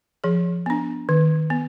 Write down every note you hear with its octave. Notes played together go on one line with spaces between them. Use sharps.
F3 G#4
B3 D4
D#3
B3